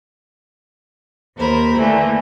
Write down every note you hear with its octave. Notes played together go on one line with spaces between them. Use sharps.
D#2 A#3 A#4 C5 B5
D3 E3 A3 A#3